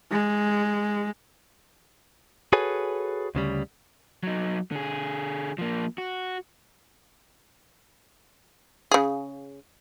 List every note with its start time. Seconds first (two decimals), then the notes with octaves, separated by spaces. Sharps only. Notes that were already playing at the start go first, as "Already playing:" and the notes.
0.12 G#3
2.53 F#4 G#4 A4 B4 C#5 G#5
3.35 D2 C#3 G3
4.23 F#3 D#4
4.71 D3 G#4
5.58 F3 A#3
5.98 F#4
8.91 C#3 G#4